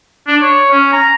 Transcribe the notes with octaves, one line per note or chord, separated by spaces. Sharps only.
D4
C#5
C#4
A#5